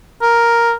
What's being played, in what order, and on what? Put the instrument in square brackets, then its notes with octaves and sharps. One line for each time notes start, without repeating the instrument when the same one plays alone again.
[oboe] A#4